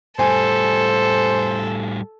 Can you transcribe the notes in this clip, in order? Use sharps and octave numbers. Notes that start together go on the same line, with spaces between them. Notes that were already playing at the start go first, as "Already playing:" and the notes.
A2 G3 A4 C5 G#5